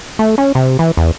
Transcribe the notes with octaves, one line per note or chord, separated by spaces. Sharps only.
A3
C#4
C3
E3
E2